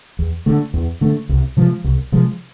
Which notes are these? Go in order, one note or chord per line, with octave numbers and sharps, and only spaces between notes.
E2
D3 A3
E2
D3 A3
C2
C3 F3 G#3
C2
C3 F3 G#3